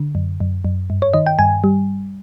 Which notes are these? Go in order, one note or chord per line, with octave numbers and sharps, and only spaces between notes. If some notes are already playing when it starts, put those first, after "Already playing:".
Already playing: D3
F#2
F#2
F#2
G2
C#5
D#3 D#5
G5
G2 G#5
G3